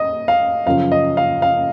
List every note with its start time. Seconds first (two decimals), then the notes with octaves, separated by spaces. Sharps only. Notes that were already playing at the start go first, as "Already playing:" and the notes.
Already playing: D#5
0.28 F5
0.66 F#2 C#3 F3 F5
0.92 D#5
1.17 F5
1.42 F5